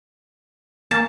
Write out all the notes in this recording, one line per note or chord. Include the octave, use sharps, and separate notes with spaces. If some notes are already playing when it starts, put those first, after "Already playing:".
A#3 A5